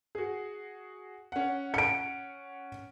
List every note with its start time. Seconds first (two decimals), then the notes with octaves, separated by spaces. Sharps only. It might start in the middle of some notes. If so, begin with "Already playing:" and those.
0.15 F#4 G#4
1.32 C#4 F#5
1.74 C#7 D7